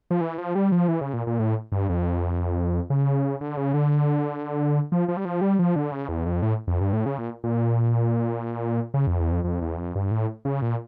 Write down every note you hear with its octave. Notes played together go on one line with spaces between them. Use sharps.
F3
E3
F3
G3
F3
E3
C#3
A#2
A#2
A2
G2
F2
C#3
D3
C#3
D3
F3
F3
G3
F3
G3
F3
D3
C#3
E2
F2
A2
F2
G2
A2
C#3
A#2
A#2
C#3
F2
E2
F2
F2
E2
F2
G2
A2
C#3
A#2